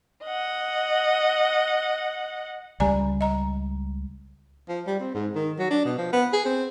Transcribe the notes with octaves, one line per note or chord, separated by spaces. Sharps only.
D#5 F#5
C#2 G3 D5 G#5 A#5
D#5 A#5
F3
G3
C4
G#2
D#3
F#3
D4
B2
F3
B3
G#4
C4